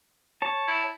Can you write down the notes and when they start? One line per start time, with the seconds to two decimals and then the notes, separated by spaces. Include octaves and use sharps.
0.42 C#5 A5
0.68 E4